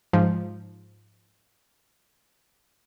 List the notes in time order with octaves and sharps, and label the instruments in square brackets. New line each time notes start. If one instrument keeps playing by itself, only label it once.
[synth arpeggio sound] G#2 F3